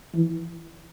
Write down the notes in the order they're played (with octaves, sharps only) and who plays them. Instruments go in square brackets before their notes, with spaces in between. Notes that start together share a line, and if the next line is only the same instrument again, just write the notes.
[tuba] E3